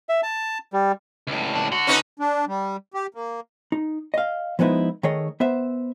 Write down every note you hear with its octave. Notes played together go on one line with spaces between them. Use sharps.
E5
A5
G3
C#2 A2
D4
D3 F#4
C#4 D#4 B4
D4
G3
G4
A#3
D#4
D#5 F5
F3 G#3 B3 D#4 E4 B4
D#3 A3 G#4 C#5 D#5
B3 C5 E5